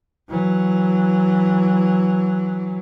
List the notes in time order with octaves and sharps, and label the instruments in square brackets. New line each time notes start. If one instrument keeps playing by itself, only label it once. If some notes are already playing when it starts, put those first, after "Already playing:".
[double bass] E3 F#3